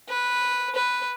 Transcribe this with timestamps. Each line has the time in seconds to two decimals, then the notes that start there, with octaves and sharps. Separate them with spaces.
0.09 B4
0.75 B4